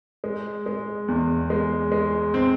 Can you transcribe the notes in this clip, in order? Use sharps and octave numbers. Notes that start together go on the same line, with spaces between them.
G#3
G#3
E2
G#3
G#3
C4